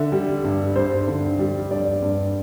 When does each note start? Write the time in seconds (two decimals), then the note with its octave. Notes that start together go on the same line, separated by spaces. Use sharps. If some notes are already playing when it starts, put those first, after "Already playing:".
Already playing: D3 E5
0.12 G3
0.44 G2
0.76 G2 C5
1.08 D3
1.39 G3
1.71 G2 D5
2.02 G2